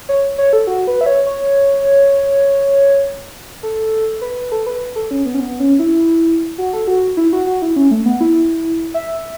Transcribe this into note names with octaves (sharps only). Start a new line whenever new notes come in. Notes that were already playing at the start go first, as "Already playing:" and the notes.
C#5
C#5
A4
F#4
B4
E5
C#5
C#5
A4
B4
B4
A4
B4
A4
C#4
B3
C#4
B3
C#4
E4
F#4
A4
F#4
E4
F#4
F#4
E4
C#4
A3
B3
E4
E5